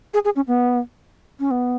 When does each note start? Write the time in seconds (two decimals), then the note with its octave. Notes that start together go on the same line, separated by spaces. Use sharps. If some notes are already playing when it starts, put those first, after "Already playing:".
0.14 G#4
0.25 G#4
0.36 C#4
0.47 B3
1.40 C#4
1.51 B3